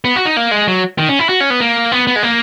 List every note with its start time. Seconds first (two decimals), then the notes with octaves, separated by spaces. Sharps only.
0.05 B3
0.16 F#4
0.26 D#4
0.37 A#3
0.51 G#3
0.68 F#3
0.98 D#3
1.09 C#4
1.19 E4
1.29 F#4
1.40 C#4
1.50 B3
1.61 A#3
1.92 B3
2.07 B3
2.16 G#3
2.23 A#3